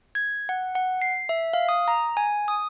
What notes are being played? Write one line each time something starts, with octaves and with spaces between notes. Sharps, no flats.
G#6
F#5
F#5
C7
E5
F5
D#6
A#5
G#5
D#6